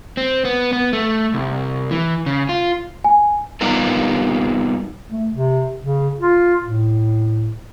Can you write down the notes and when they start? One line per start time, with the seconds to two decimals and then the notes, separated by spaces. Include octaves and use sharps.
0.17 C4
0.45 B3
0.73 B3
0.93 A3
1.34 C2
1.91 E3
2.26 C#3
2.49 F4
3.04 G#5
3.61 G3 B3 D#4 F4 G4 A#4
5.10 A3
5.31 C3
5.81 C#3
6.19 F4
6.62 A2